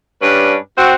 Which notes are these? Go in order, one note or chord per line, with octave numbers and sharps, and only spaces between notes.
G2 C#4 D4 B4
C4 F#4